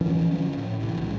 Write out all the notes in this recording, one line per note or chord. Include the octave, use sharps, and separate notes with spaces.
E3 F3 C#4
D3 F3 F#3 C#4
A2
B1 C3 D#3 E3
A2 C#3 F#3 G#3